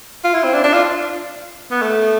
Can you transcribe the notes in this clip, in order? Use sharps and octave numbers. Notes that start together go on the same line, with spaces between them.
F4
E4
C4
D4
D4
F4
B3
A3